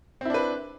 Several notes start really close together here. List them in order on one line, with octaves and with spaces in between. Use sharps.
C4 E4 D4 B4